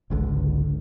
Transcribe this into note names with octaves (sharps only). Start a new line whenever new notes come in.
G#1 C#2 D3